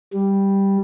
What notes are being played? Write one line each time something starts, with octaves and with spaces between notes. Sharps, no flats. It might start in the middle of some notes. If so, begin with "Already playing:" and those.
G3